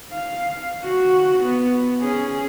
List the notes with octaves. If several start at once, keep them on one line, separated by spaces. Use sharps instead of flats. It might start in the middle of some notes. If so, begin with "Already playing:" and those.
F5
F#4
B3
C#4 G#4